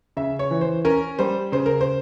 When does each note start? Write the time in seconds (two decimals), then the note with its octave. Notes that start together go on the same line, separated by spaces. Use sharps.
0.17 C#3 E5
0.39 C#5
0.51 E3
0.61 C5
0.85 C#4 A#4
1.19 G3 C5
1.52 C#3 C5
1.66 A#4
1.81 C5